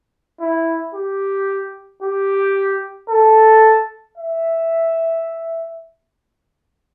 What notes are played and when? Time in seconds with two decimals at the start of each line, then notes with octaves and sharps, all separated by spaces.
0.41 E4
0.95 G4
2.02 G4
3.10 A4
4.17 E5